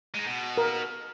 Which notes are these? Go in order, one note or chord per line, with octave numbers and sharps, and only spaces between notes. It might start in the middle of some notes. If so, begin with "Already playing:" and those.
G#3 D#4
B2
A#4